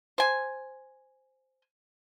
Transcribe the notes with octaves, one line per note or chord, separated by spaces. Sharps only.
C5 G#5